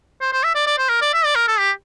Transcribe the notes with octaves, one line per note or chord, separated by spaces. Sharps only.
C5
C5
E5
D5
D5
C5
A#4
D5
E5
D5
A#4
A4
G4